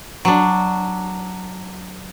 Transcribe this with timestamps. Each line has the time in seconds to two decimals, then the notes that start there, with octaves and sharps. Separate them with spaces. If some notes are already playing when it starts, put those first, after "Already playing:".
0.25 F#3 D4